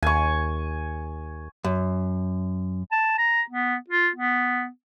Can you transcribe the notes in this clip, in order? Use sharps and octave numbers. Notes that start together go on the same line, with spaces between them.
D#2 G#5 C#6
F#2
A5
A#5
B3
F4
B3